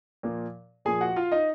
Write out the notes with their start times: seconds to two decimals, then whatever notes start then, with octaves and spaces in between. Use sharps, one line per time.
0.23 A#2 F3 A#3
0.85 A#2 F3 A#3 G#4 G#5
1.01 F#4 F#5
1.16 F4 F5
1.32 D#4 D#5